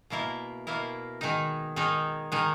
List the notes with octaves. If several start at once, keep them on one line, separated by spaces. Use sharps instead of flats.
B2 A#3 E4 A#4
B2 A#3 E4 A#4
D#3 G#3 D#4
D#3 G#3 D#4
D#3 G#3 D#4